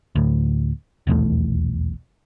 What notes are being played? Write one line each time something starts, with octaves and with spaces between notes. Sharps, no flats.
D2 A2
D#1 B1 E2 A3